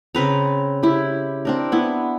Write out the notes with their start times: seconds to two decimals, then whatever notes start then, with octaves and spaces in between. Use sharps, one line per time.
0.15 C#3 C4 B4 A#5
0.83 E4 G4
1.45 C4 D4 A#4
1.72 B3 E4